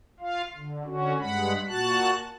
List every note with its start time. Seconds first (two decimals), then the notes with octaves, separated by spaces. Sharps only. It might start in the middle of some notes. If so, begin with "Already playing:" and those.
0.20 F4 F5
0.55 D3
0.85 D3 C#4 F#4
1.19 G2 G#3 F#5 B5
1.68 A#2 F#4 A5 F#6